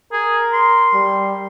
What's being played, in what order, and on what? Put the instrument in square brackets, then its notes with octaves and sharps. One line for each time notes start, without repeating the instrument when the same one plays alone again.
[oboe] G#4 [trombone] A#4
[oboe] C6
[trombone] G3